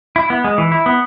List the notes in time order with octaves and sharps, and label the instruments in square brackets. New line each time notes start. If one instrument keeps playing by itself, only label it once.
[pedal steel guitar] E4
B3
G#3
E3
E4
B3